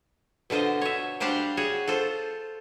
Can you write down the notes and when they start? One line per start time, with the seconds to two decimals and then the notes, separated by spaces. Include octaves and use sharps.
0.50 B2 D3 F4 C5 D#5
0.81 C#5 E5
1.20 G3 D4 G4 C5 F5 F#5
1.57 F#4 G#4 C#5
1.87 F4 A4 C5